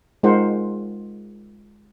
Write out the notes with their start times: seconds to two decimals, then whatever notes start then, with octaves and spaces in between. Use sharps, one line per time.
0.23 G#3 D#4 F4 A#4 C5 F#5